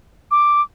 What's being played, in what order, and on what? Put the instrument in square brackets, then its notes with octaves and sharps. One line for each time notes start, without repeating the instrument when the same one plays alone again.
[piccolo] D6